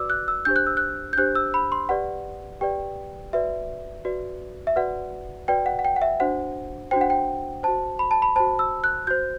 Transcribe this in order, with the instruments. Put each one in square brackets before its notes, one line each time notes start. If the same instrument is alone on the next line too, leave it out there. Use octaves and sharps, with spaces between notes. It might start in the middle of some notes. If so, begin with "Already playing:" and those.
Already playing: [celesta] F#4 B4 D5 D6 E6
F#6
E6
D4 G4 C5 G6
F#6
E6
F#6
G6
D4 G4 C5 F#6
E6
B5
C6
G4 B4 D5 F#5
G4 B4 D5 G5
F#4 B4 D5 E5
F#4 B4 D5
E5
F#4 B4 D5 F#5
F#4 B4 D5 G5
F#5
F#5
G5
F#5
E5
D4 F#4 C5 F#5
D4 F#4 C5 G5
F#5
G5
F#4 C5 A5
B5
A5
B5
F#4 C5 A5
E6
F#6
F#4 C5 G6